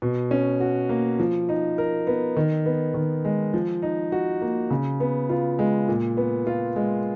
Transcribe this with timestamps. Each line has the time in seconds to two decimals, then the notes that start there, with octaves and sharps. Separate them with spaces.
0.02 B2
0.31 C#4
0.60 F#4
0.89 A#3
1.19 F3
1.49 D#4
1.78 A#4
2.07 B3
2.36 D#3
2.66 B3
2.94 D#3
3.25 G#3
3.53 F3
3.82 D#4
4.12 F#4
4.41 A#3
4.70 C#3
5.00 B3
5.30 F4
5.59 G#3
5.88 A#2
6.17 B3
6.47 F4
6.76 G#3